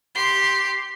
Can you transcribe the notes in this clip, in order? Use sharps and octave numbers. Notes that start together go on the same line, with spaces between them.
G4 C6